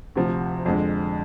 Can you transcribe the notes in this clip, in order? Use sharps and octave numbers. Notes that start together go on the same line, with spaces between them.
D2 C3 F3
F2 D3 G#3